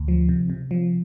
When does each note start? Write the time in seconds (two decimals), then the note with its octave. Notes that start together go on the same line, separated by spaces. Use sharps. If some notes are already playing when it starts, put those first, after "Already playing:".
Already playing: D2
0.08 F3
0.29 C3
0.50 C3
0.71 F3